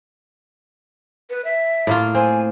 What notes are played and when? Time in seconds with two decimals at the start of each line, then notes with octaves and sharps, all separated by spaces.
1.30 B4
1.45 E5
1.87 A2 A#3 F4
2.15 C4 G#5